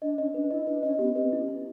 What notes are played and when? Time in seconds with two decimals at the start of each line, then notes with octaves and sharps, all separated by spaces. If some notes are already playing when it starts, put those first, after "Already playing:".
0.02 D4 D#5
0.18 C#4 D#5
0.34 D4 B4
0.51 E4 D#5
0.67 D4 B4
0.83 C#4 D#5
0.99 B3 G4
1.15 C4 B4
1.32 C#4 E4
1.48 E4